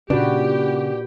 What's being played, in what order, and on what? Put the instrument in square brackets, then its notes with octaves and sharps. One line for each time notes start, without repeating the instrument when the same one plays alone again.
[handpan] A#2 F#4 B4 [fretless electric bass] C#3 [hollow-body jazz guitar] D4 [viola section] G4